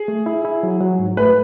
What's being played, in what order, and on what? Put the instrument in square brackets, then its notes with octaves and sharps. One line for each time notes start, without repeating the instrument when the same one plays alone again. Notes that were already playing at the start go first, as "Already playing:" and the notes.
Already playing: [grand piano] G#4
[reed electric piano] A3
E4
E4
F#3
F#3
G#2
[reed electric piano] A3 [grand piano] B4